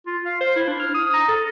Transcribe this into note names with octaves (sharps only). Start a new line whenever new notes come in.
F4
F5
C5
E4
D4
F6
D#6
A#5
A4